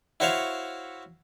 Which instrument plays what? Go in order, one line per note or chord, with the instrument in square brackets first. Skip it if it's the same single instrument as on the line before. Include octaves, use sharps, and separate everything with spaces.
[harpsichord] E4 F#4 C5 C#5 E5 F5